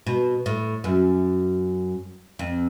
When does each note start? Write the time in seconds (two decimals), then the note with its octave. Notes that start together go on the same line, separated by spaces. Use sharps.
0.06 B2
0.46 A2
0.84 F#2
2.39 F2